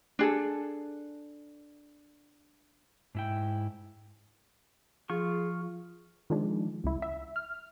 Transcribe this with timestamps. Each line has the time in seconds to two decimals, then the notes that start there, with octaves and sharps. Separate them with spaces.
0.19 D4 G#4 A4
3.15 G#2 E4 G5
5.10 F3 F4 G#4 C#6
6.30 D#3 F3 G#3 D4
6.84 C#2 E4
7.02 E5
7.36 F6